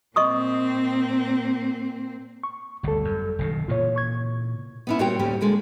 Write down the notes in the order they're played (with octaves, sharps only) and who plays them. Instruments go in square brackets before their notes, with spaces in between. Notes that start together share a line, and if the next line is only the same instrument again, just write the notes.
[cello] A#2 C4 [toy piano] D#5 C#6 D#6
[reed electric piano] C#6
[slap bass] G1 D2 [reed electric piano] G3 A4
[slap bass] F#2
F#1 B2 D#3
[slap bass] A#2 C#3 E3 [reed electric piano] F4 C#5
[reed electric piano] C#6 G#6
[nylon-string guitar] B3 C#4 E4
A#2 G3 F#4 C5 C#5 G5
D2 A2 G3 C#4 G4
A#2 D3 G#3